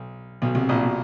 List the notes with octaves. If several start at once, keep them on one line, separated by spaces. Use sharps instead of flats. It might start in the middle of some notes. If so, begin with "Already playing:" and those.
Already playing: B1
B1 B2
C2 C3
A#1 A#2
B2